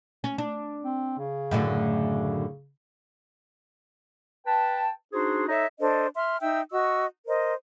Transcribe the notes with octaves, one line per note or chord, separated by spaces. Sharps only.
C#4
D4
C4
C#3
F#2 A2 D3
B4 G5 A5
D4 D#4 F#4 G#4 C5
D#4 A4 C#5 D#5 E5
D4 A4 C5 D#5
E5 C6 F6
D#4 E5 G5 E6
F#4 D#5 C#6 E6
A#4 C5 D#5